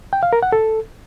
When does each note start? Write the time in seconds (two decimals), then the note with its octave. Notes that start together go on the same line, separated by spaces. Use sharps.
0.13 G5
0.23 F5
0.33 A#4
0.43 F#5
0.52 A4